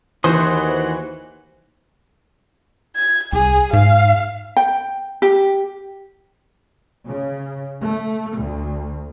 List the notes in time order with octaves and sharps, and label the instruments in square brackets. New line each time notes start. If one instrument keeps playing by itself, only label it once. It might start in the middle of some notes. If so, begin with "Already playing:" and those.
[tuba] D#2 [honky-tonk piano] E3 [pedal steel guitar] F#4 C6 D#6 [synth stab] C5
[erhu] G#6
[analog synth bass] C2 [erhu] G#4
[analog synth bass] G#2 [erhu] F5
[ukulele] G5
G4
[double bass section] C#3
A3
D2